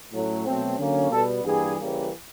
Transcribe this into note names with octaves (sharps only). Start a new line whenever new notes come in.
A2 F#3 A3 C#4
B2 F#3 A3 C4
D3 F#3 A#3 C#4
B2 G3 B3 A4
G2 E3 G3 A#3 G#4
C#3 E3 G3 A#3